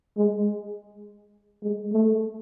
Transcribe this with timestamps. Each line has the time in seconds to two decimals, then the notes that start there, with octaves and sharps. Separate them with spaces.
0.17 G#3
1.63 G#3
1.93 A3